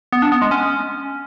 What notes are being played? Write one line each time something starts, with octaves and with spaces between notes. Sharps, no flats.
B3
D4
B3
G#3
C#4